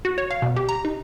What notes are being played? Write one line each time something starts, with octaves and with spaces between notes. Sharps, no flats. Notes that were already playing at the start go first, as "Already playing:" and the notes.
F#4
C#5
F5
B2
G4
A#5
D#4